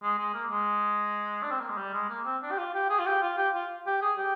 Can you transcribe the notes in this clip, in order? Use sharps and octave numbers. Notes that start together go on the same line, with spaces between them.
G#3
G#3
A#3
G#3
D4
C4
A#3
G#3
G3
G#3
A#3
C4
D4
G4
F4
G4
G#4
F4
G4
F4
G4
F4
G4
G#4
G4